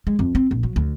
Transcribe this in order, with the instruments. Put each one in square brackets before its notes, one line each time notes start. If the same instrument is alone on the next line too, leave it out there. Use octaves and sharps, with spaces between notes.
[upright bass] G#3
F2
C4
A#1
F#3
D2